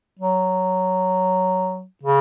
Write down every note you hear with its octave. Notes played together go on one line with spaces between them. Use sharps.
F#3
C#3